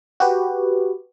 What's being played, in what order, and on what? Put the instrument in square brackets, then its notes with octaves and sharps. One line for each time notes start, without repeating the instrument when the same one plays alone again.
[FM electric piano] F#4 G4 B4